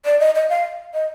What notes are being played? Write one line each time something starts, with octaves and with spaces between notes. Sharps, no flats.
D5
D#5
D#5
F5
D#5